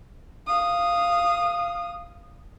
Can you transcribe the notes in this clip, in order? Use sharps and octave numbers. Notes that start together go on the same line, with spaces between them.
F5 D#6